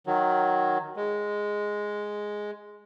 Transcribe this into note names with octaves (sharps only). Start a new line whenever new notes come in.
D#3 F#3
G#3